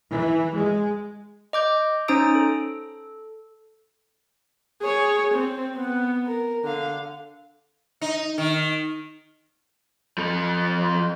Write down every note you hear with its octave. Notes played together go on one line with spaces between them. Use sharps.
E3
G#3
D#5 D6 G6
C#4 D#4 C5 A#5 D#6 D7
A4
G#4 C#5
C4
B3
A#4
D3 F5
D#4
D#3
F3 A4